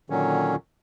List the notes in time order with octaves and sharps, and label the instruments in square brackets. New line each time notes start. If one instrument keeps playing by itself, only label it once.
[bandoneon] A#2 D3 D#3 F#3 C#4